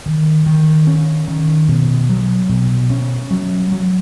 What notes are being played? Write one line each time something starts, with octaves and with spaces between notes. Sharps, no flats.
D#3
D#3
C#4
D#3
B2
F#3
B2
C#4
F#3
F#3